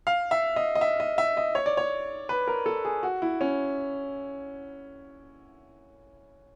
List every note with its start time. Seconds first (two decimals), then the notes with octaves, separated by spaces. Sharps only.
0.07 F5
0.31 E5
0.56 D#5
0.75 D#5
0.81 E5
1.00 D#5
1.18 E5
1.37 D#5
1.55 C#5
1.66 D5
1.77 C#5
2.29 B4
2.48 A#4
2.66 A4
2.85 G#4
3.03 F#4
3.22 E4
3.41 C#4